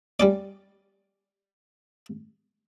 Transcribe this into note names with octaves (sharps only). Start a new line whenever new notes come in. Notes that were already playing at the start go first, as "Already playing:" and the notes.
G3 C#4 D5